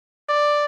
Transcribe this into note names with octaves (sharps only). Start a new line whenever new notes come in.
D5